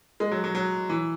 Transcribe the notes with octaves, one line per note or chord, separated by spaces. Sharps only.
G#3
F#3
F#3
F#3
E3